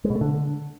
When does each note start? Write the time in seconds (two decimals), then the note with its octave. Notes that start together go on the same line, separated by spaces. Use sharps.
0.04 G#3
0.10 B2
0.16 A3
0.21 D3